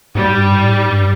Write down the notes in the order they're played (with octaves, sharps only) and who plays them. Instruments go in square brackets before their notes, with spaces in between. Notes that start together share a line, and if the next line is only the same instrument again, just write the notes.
[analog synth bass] G#2 [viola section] G3
[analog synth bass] G2
G#2
A2
G#2
G2